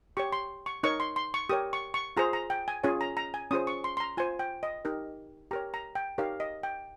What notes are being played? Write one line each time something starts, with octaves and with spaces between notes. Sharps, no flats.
G4 C#5 C#6
C6
C#6
D#4 A#4 C#5 C#6
C6
C6
C#6
G4 A#4 C#5 D#6
C#6
C#6
F4 G#4 C5 A#5
A#5
G5
G#5
C#4 F4 G#4 C#5 G#5
A#5
A#5
G#5
C#4 F4 G#4 C5 D#6
C#6
C6
C6
A#5
F4 C5 G#5
G5
D#5
D#4 G4 A#4
G4 A#4 C#5 A#5
A#5
G5
D#4 G4 A#4 C#5 F5
D#5
G5